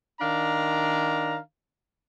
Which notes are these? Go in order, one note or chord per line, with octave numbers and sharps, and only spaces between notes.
D#3 D4 F5 A#5